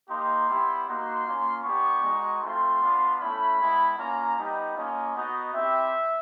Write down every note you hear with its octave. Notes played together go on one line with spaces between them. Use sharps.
A#3 D#4 G4 C6
G3 B3 E4 G4
A#3 D#4 F#4 C6
A#3 C#4 F4
B3 D4 G4 C#6
G#3 B3 D#4 F#4
A3 C4 F4 C6
B3 D4 F4
A3 C#4 E4 B5
G#3 B3 E4
A#3 C#4 F4 A#5
G3 B3 D#4
A#3 C#4 F4 D#5
B3 D#4 F#4
C4 E4 G4 E5